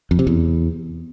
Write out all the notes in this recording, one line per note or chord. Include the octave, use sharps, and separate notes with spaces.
F2
C3
E2